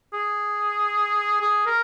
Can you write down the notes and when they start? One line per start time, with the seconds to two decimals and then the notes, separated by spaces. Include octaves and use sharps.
0.13 G#4
1.41 G#4
1.66 A#4